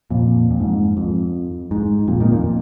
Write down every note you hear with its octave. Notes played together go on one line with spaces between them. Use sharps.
F2 A#2
F2
G#2
F2
G#2
F2 A#2
A#2 D#3
F2 A#2